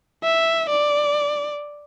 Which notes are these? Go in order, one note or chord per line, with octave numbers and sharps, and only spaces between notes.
E5
D5